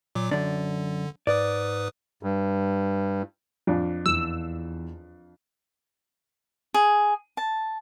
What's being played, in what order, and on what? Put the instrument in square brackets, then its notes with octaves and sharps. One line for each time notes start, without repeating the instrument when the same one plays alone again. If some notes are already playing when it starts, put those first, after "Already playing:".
[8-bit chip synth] A#2 F#3 D6
[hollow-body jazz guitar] F#2 D4 [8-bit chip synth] D3
[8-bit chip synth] G#2 B4 D#6 [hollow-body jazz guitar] D5
[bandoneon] G2
[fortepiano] F2 D4
[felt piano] E2 [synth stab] E6
[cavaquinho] G#4
A5